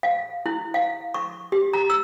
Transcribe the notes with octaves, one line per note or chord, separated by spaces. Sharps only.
F5
E4
F5
C#6
G4
A#5
E6